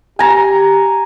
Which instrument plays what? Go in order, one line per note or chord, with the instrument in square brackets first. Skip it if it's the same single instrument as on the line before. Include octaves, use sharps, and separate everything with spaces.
[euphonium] G4 [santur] G#5 A#5